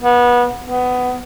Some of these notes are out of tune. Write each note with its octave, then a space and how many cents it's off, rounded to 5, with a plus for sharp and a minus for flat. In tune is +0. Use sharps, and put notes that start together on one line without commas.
B3 -25
B3 +15